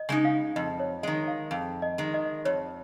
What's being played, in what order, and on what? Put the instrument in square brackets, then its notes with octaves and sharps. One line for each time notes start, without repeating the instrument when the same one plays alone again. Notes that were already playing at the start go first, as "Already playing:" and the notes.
Already playing: [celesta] D#5
[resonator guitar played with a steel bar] C#3 G#3 D#4
[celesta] F5
[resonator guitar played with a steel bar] F2 [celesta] D#5
[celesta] C#5
[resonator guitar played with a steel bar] D#3 G#3 [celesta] D#5
[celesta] F5
[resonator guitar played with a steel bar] F2 [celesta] F5
[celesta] D#5
[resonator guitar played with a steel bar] D#3 G#3
[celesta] D#5
[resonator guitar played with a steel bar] F2 [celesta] C#5